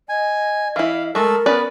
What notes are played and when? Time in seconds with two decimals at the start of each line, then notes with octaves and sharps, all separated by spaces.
0.09 D#5 G#5
0.76 E3 E4 F5
1.15 G#3 A3 A4 A#4 E6
1.46 B3 C#4 B4 D5